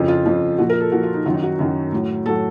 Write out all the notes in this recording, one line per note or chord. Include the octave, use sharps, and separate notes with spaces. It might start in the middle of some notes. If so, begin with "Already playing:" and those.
Already playing: F2 C#3 F3
F4
F2 C#3 F3
A#2 F3 F#4
A#4
A4
A#2 F3 F#4
F4
D#4
F#2 D#3 F#3 F4
D#4
F#4
F#2 D#3 F#3
A2 F#3
A2 F#3 A4